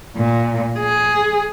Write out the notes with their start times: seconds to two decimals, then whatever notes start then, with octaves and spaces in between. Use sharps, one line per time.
0.16 A#2
0.78 G#4